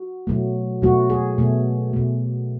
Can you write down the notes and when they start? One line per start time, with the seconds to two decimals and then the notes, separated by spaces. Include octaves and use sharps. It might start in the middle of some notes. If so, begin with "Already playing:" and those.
Already playing: F#4
0.27 B2 F#3 A3
0.82 B2 F#3 A3 F#4
1.10 G#4
1.38 B2 A3
1.93 B2 A3